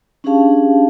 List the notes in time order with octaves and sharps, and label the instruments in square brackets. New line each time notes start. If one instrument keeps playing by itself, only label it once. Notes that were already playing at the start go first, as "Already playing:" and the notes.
[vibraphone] C#4 D4 G4 G#4 F5 A5